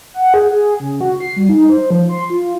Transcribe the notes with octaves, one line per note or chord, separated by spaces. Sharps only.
F#5
G#4
G#4
C#3
F#4
C7
G3
D#4
C5
F3
C6
F4